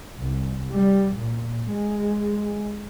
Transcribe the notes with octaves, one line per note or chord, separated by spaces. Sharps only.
C2
G3
A#2
G#3